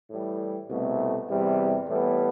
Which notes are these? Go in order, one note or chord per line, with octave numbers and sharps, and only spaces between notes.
A2 E3 G3
C2 B2 A3
E2 C3 G3
A2 E3 G3 B3